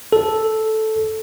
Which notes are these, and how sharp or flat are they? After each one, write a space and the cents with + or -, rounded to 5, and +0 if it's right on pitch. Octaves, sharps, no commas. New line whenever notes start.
A4 -5